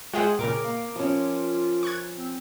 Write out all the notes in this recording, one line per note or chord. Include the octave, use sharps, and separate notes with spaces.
G#3 F4 G#4 C5 E5 F#5 G5
A#2 C#3 A#4 D6
A#3
F3 C#4 F4
C#6 F#6 G#6
C4